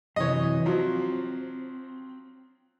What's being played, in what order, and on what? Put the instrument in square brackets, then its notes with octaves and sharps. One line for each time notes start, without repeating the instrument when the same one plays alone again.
[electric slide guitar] F#2 C3 E3 [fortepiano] C#5 D#5
[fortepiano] F3 F#3 [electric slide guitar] C4